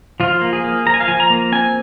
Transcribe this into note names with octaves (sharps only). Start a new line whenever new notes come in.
F3 F4
A#3
G#4
A#3
F3 A#5
G#5
F5
F3 G#5
A#5
A#3
C4 G#5